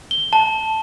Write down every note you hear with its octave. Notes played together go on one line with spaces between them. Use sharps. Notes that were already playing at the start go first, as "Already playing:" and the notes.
G7
A5